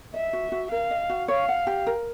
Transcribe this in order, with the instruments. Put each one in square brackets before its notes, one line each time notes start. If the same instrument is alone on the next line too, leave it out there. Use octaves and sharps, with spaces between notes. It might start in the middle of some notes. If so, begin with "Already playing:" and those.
[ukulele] D#5 [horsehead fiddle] E5
[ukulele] F#4
F#4
[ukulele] A#4 [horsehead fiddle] F5
[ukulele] D#5
F#4
[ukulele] C#5 [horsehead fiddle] F5
[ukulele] F#5
G4
A#4